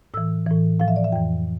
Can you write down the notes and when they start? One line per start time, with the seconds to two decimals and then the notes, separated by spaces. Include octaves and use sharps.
0.14 A2 E3 E6
0.47 A2 E3
0.80 A2 F3 F5
0.88 E5
0.96 D5
1.04 E5
1.12 F2 E3 G5